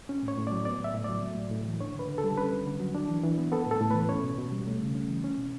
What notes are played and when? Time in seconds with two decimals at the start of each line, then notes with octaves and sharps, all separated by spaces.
0.09 C#4
0.23 A2
0.28 C#5
0.38 A2
0.47 D5
0.51 F#3
0.65 B3 D5
0.80 A2 E5
0.94 A2
1.04 D5
1.09 F#3
1.24 A3
1.37 A2
1.51 A2
1.67 E3
1.80 D4 C#5
1.95 D3 B4
2.09 D3
2.18 A4
2.24 G3
2.37 C#4 B4
2.51 D3
2.67 D3
2.80 F#3
2.94 D4
3.09 E3
3.23 E3
3.38 B3
3.52 B3 A4
3.67 A2 A4
3.81 A2
3.91 B4
3.95 E3
4.09 C#4 C#5
4.24 B2
4.38 B2
4.52 G3
4.67 A3
4.81 C#3
4.95 C#4
5.09 E3
5.24 C#4
5.37 B2